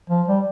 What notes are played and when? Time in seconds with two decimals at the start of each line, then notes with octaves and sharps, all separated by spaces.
0.10 F3
0.28 G3